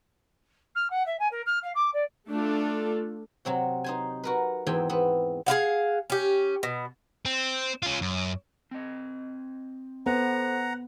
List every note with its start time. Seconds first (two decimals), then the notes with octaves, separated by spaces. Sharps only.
0.75 F6
0.90 F#5
1.06 E5
1.20 G#5
1.32 A#4
1.46 F6
1.63 F5
1.75 D6
1.94 D5
2.29 A3 D4 F4 A4
3.45 C3 F#3 C4 F#4
3.84 D#4 C5 G#5
4.24 F#4 A#4 B4
4.67 E2 G#2 E3 C4 G5 G#5
4.89 B3 C4 B4
5.46 G#4 C5 F5 F#5
6.10 C#4 G4
6.63 B2
7.25 C4
7.83 C#4 F4
8.02 F#2
8.71 C4 D#5
10.06 B3 A4 C5 F#5 A#5